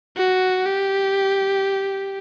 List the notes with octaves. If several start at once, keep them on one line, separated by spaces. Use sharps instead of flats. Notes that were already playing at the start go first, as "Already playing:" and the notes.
F#4
G4